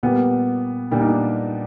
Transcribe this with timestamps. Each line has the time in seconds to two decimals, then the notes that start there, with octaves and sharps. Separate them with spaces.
0.03 A#2 G3 A#3 B3
0.91 A#2 G3 A#3 D4
1.00 D#4
1.08 D4